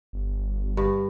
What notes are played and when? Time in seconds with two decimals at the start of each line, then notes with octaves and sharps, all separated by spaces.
0.13 G1
0.77 G2